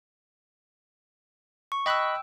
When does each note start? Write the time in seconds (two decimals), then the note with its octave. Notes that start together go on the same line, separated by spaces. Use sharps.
1.72 C#6
1.86 D#5 G5 B5 E6 F#6